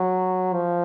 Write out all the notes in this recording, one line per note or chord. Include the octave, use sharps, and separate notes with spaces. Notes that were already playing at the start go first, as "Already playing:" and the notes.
Already playing: F#3
F3